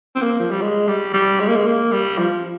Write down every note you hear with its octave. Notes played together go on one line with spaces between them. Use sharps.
C4
A#3
F3
G3
G#3
G3
G3
G#3
A#3
G#3
A#3
G3
F3